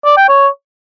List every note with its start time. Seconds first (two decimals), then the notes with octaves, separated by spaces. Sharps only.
0.05 D5
0.17 G5
0.29 C#5